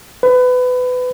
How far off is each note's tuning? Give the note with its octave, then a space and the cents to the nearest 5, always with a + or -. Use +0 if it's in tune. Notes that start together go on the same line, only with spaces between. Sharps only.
B4 +25